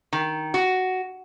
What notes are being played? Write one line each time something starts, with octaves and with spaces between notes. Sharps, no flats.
D#3
F#4